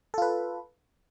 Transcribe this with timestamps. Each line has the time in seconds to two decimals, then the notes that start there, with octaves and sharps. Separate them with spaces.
0.14 A4
0.18 F4
0.22 B4